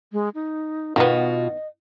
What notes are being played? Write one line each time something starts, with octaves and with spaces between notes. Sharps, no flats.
G#3
D#4
B2 D#3 B3 F4 F#4 D#5